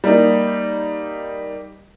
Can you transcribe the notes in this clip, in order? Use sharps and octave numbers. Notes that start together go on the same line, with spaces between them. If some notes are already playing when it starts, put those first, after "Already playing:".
G3 A#3 D#4